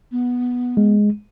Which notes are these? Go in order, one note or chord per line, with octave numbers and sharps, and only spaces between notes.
B3
G#3